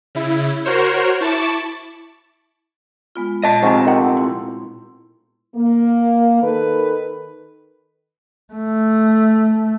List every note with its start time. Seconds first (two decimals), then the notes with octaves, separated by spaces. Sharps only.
0.15 C#3 E4
0.65 F#4 A#4 C5 C#5
1.21 E4 A5 C#6 D6
3.16 G#3 B3 F4
3.44 A#2 D#5 A5
3.63 F2 G#2 C3 G#5 A5 C#6
3.86 D#3 F#5
4.17 E4 C6
5.55 A#3
6.42 D#3 A4 B4
8.53 A3